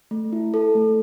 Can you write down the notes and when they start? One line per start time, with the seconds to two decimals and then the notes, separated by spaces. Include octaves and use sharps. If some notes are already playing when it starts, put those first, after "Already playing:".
0.11 A3
0.33 E4
0.54 A4
0.75 A3